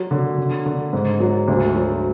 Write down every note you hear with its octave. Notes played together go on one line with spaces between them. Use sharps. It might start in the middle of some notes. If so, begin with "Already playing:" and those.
Already playing: F#3
D3
D3
D3
G#2
F#3
D2
F#3